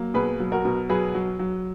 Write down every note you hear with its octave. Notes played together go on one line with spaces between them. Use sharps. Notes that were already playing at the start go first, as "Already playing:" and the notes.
Already playing: F#3 A#3
B2 G#4 B4
F#3
F#4 A#4
B2
F#3 G#4 B4
F#3
F#3